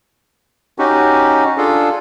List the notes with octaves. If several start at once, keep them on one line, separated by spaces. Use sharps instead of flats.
C#4 D#4 F#4 G4
D4 F4 G#4 A4